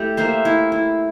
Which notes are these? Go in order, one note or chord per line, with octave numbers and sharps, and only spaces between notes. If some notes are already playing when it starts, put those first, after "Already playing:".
Already playing: A3 E4 G4
A#3 C5 E5
E4
E4